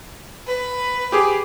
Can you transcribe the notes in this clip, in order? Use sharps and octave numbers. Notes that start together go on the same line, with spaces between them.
B4
G4 G#4 D6